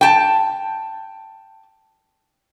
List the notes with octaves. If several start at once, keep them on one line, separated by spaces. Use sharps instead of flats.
G5 A5